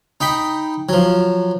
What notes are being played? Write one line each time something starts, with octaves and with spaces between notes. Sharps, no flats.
D#4 G5 B5
F3 F#3